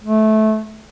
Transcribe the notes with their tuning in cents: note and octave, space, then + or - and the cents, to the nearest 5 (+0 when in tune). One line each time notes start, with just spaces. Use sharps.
A3 -20